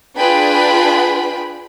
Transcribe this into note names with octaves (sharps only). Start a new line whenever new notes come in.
D4 F4 G#4 B4 G5 B5